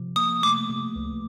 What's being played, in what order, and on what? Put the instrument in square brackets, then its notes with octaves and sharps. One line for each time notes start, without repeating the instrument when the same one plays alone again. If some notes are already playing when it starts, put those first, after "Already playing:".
Already playing: [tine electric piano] C3 F3
[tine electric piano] A#3 [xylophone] D#6
[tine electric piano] A3 [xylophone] D6
[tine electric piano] C3
C#2